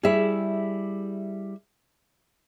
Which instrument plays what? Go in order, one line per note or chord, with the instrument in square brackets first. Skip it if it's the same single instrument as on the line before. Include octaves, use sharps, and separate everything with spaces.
[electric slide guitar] G3 E4 [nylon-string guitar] G#4 E5